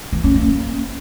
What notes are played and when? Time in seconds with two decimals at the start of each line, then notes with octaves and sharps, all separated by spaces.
0.13 E3
0.24 C#4
0.36 A#3